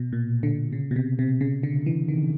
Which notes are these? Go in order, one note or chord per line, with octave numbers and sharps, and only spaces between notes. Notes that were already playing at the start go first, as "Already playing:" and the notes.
Already playing: B2
A#2
D3
C#3
B2
C3
C3
C#3
D3
E3
D#3